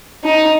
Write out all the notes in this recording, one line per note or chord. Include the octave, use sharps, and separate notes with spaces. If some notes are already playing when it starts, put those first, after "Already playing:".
D#4